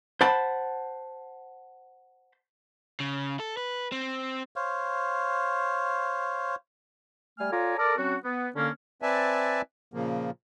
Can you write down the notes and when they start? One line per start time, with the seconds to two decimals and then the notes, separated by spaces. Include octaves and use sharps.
0.21 C5 F#5 A5 B5
3.00 C#3
3.40 A4
3.57 B4
3.92 C4
4.56 C5 C#5 F5
7.39 G3 A3 G#5 F6
7.51 F4 A4 C#5 D5 G#5 A#5
7.77 A4 A#4 D5
7.97 F#3 C4 C#4 F#4
8.23 B3
8.56 D3 A#3 C#4
9.02 C4 B4 D5 E5 G#5 A5
9.94 A#2 C#3 F3 A#3